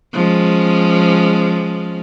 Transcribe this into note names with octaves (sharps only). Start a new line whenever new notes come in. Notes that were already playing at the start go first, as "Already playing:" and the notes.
F3 G#3 C#4